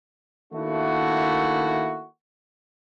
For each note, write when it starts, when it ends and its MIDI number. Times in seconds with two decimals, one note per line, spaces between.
0.53 2.05 51
0.53 2.05 57
0.53 2.05 58
0.53 2.05 62
0.53 2.05 64
0.53 2.05 66